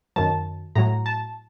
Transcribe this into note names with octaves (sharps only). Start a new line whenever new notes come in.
F#2 D#3 F#3 A5
A2 F#3 A#5
A5